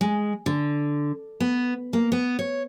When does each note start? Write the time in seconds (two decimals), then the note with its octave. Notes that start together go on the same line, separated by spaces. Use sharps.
0.01 G#3
0.46 D3
1.40 B3
1.93 A#3
2.12 B3
2.39 C#5